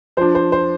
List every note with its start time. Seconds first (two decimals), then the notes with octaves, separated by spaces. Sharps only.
0.17 F3 D4 C5
0.35 C5
0.52 C5